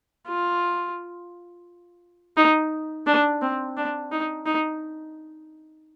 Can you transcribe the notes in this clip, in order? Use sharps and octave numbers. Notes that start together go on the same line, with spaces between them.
F4
D#4
D4
C4
D4
D#4
D#4